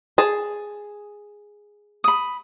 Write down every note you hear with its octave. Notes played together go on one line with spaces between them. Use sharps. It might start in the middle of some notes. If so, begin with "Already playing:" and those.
G#4 A5
B5 D#6